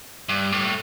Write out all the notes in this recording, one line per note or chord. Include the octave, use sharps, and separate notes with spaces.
G2
A2